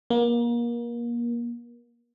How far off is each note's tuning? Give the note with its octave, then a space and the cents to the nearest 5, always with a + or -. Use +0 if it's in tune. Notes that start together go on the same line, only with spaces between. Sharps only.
A#3 +30